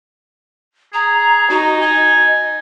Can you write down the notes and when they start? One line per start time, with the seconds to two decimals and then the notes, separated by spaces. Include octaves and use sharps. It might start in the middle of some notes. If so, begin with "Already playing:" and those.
0.93 G#4 A#5
1.50 D#4 F#4
1.81 D#5 G#5